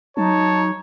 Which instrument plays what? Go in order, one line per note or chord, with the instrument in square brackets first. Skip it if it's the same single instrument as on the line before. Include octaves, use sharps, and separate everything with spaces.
[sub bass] F#3 [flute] D#4 [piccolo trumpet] C#5 [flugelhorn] A5